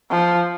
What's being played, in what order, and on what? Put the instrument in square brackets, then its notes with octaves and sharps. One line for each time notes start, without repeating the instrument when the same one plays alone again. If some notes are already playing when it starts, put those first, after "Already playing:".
[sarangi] F3